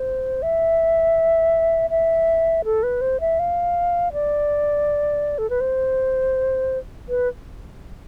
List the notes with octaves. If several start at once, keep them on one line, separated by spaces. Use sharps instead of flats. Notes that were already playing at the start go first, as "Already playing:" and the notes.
Already playing: C5
E5
E5
A4
B4
C5
E5
F5
D5
A4
B4
C5
B4